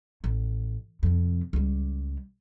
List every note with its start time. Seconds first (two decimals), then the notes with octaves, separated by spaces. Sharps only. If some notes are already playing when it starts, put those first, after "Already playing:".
0.24 A1
1.03 F2 C3
1.53 C#2 G3